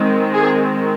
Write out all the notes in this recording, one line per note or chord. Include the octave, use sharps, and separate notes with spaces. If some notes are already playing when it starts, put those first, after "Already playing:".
Already playing: D#3 G#3 C4
G#4